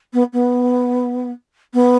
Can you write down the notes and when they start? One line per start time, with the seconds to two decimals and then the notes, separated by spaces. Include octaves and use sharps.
0.13 B3
0.33 B3
1.74 B3